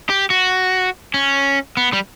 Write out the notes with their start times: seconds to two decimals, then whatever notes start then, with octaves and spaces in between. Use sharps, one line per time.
0.10 G4
0.30 F#4
1.14 C#4
1.77 B3
1.93 G3